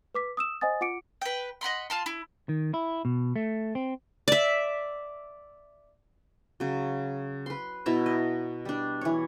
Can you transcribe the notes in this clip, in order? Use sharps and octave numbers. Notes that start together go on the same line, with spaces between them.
B4 D6 B6
D#6 E6 E7
C5 D#5 F#5 G#5 D#6 A6
F4 F#5 D6 C#7 D7
B4 G5
D#5 F#5 B5 C6
F4 A5 C6
E4
D#3
E4
B2
A3
C4
D5 E5
C#3 F#3
B4 C6
B2 E4 A5 A#5
D#5
G3 D4
E3 C#5